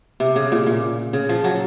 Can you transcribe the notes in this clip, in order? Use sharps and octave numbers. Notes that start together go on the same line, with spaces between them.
C3
C#3
A#2
A#2
C#3
F3
F#3